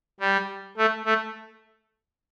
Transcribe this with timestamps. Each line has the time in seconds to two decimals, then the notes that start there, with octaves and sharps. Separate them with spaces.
0.20 G3
0.77 A3
1.05 A3